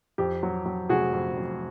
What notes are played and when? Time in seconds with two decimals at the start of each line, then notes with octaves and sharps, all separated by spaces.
0.18 F2 G4
0.43 F#3
0.66 F#3
0.89 F1 F#4 G#4
1.13 F2
1.38 F#3